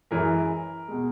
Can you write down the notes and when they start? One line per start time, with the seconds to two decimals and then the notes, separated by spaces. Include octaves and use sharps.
0.11 F#2 E3 G#3 A#4
0.88 B2 G#3